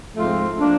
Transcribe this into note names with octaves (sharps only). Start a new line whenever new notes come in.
G#2 F3 A3 C4 F4
F3 A#3 D4